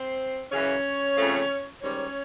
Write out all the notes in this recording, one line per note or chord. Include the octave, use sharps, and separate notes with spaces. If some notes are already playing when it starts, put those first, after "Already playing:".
Already playing: C4 C5
F#2 C#3 E3 C#4 C#5
F2 C#3 F3 A3
G#2 D#3 G3 C#4 C#5